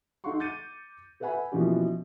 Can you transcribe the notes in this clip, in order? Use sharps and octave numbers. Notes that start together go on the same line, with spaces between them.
D#4 A4 F5 F#5 C6 C#6
D6 G6 A6 C#7 D#7
A4 B4 E5 F#5 G#5 B5
B2 E3 F3 A#3 C#4 G4